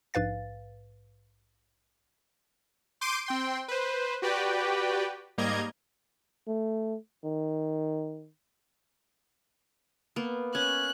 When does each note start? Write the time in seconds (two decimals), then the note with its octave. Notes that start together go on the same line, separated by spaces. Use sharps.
0.14 A#1 G#2 B4 F5 A6
3.01 C6 D6 G6 C7 D7 D#7
3.26 C4 G5 C6
3.68 B4 C5
4.22 F#4 G4 B4 D5 G5
5.38 G#2 G3 A#3 D#5 A#5 G#6
6.48 A3
7.24 D#3
10.16 A#3 B3
10.55 C#4 F#6